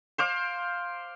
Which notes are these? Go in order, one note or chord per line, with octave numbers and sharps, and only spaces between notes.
C5 F5 D6